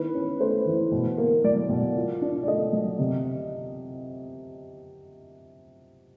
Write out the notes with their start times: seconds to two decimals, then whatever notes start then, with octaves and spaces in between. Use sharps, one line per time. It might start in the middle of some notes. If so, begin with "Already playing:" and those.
Already playing: D#3 E4 B4
0.14 C#4
0.40 A3 C5
0.66 E3
0.92 B2
1.18 A#3
1.44 F#3 D5
1.69 B2
1.95 F4
2.22 D4
2.43 D5
2.47 A3 D#5
2.73 F#3
2.99 C3